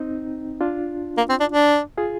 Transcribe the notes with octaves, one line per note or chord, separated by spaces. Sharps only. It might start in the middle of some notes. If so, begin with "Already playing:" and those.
Already playing: C4 D#4
D4 F4
A#3
C4
D4
D4
F4 G#4